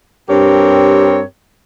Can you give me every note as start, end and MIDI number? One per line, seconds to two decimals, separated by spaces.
0.28 1.22 43
0.28 1.22 60
0.28 1.22 67
0.28 1.22 70
0.28 1.22 73